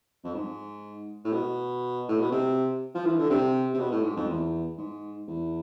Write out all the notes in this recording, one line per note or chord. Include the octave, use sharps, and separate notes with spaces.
F2
G#2
A2
B2
A2
B2
C3
F3
E3
D3
C3
C3
B2
A2
G#2
F2
E2
G#2
E2